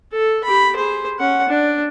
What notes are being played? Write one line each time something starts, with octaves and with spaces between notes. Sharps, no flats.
A4
G4 B5
G#4 C5
C#4 F#5
D4